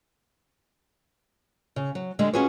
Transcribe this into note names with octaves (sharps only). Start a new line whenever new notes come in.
C#3
F#3
D3 G3 G#3
C#4 F4 F#4 G#4 B4 C#5